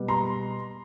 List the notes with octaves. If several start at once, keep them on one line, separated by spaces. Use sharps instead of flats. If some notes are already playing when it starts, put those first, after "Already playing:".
Already playing: B2 G3 B3
A#5 C6